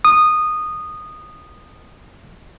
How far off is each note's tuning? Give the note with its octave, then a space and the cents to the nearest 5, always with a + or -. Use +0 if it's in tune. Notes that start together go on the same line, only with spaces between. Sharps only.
D#6 -15